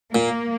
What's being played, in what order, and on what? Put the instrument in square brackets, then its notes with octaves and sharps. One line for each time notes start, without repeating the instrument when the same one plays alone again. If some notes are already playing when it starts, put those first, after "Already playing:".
[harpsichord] A#2 [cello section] A#3